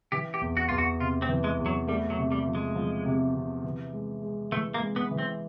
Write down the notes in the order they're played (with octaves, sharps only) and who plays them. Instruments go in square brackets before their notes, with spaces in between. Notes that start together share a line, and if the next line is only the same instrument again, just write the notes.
[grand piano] E3 [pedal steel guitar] G4
[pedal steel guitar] G4
[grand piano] E2
[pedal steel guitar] F#4
[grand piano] E2 [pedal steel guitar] F4
[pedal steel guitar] F#4
[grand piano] C3 [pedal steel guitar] F4
[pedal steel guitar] C4
[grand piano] E3
[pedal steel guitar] G#3
[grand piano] E2
[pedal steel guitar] F#3
[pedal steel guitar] G3 [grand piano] A3
[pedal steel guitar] F#3
[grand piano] C3
[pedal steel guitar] G3
[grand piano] F3
[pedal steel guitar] G#3
[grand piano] F3
C3
C3
E3
G#3
G#3
[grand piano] E3 [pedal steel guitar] A3
[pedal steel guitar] A#3
[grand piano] G#3
[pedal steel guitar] B3
[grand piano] E3
[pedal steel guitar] C4